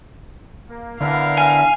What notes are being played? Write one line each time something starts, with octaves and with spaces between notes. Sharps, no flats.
A#3
D3 B3 E4 A#4 F5
G#5